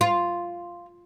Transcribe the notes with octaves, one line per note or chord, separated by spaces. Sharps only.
F4